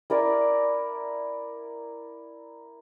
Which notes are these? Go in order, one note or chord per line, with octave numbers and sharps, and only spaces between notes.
E4 A#4 D5 G#5